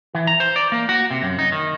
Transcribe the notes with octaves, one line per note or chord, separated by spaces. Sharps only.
E3
A#5
C5
D5
A#3
F#4
C3
F#2
D#4
D#3